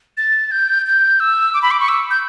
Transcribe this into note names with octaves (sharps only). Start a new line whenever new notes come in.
A6
G6
G6
E6
D6
B5
D6
C#6
E6
G6